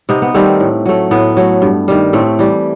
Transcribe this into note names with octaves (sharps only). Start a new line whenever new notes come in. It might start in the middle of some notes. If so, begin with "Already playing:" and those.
C3 B3 D#4
B3
D#3 G3 A3 C4
A2
F#3 A3
A2 B3
F#3 A3
G2
D#3 G3
A2 A3 C4
E3 G3